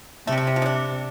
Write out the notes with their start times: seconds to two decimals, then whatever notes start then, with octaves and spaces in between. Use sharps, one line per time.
0.27 C3 G3 A3
0.38 A3
0.47 G3
0.56 F3
0.62 D#4
0.66 D4